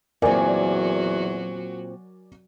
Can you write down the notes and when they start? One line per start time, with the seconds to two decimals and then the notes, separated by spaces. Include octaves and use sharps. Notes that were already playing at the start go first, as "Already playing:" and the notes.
0.22 E2 A#2 F#3 C4 F#4 A#4 D5 G#5